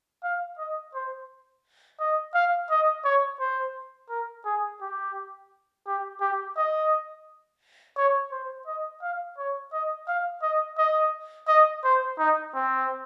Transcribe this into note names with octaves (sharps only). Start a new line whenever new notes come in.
F5
D#5
C5
D#5
F5
D#5
C#5
C5
A#4
G#4
G4
G4
G4
D#5
C#5
C5
D#5
F5
C#5
D#5
F5
D#5
D#5
D#5
C5
D#4
C4